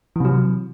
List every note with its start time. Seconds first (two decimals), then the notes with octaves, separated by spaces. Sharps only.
0.16 E3
0.20 C3
0.25 F#3